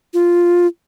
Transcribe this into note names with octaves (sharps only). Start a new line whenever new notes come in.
F4